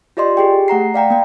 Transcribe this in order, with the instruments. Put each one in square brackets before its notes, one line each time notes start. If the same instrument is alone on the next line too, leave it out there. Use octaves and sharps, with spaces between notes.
[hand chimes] F4 G4 D5 D#5 C6
G4 G#4 G5
A3 F#5 A#5 C7
D5 F5 G5 A#5
A#3 G5